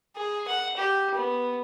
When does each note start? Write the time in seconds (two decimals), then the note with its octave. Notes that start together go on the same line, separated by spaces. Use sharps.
0.16 G#4
0.48 F#5
0.77 G4
1.15 B3